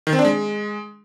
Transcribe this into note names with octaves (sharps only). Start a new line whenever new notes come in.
D#3
C4
D4
G#3